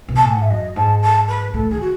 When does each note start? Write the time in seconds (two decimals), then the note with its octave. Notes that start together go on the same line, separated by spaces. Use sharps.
0.09 B2
0.16 A5
0.23 A2 G#5
0.33 G#2 F#5
0.41 E5
0.50 F#2 D#5
0.76 G#2 A5
1.02 A5
1.28 B4
1.54 A2 A4
1.70 D#3 G#4
1.80 F#4